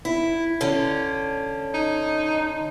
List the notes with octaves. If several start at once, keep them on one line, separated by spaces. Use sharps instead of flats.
E4
D3 C#4
D#4